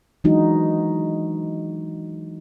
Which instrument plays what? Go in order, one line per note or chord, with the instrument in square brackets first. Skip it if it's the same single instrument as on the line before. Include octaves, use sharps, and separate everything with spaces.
[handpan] E3 F#3 G#3 D4 D#4 F#4